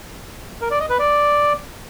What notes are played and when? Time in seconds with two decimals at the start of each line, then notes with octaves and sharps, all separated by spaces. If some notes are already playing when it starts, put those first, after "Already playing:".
0.61 A#4
0.71 D5
0.80 D#5
0.90 B4
0.99 D5